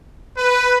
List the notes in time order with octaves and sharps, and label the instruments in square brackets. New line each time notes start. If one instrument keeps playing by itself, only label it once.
[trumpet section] B4